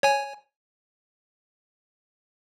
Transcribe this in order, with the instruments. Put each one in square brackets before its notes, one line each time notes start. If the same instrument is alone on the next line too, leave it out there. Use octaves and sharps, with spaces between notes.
[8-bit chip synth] C#5 G#5